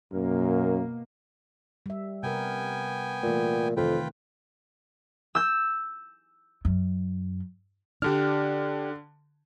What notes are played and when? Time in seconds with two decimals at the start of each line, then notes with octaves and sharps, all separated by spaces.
0.13 F#2 B2 A#3
1.86 G3 E5
2.23 C3 B3 A#4 G5 G#5
3.23 A#2 E3 A3
3.77 F2 C3 D#3 F4 B4 G5
5.35 E6 G6
6.65 F#2
8.02 D3 D4 G4 F6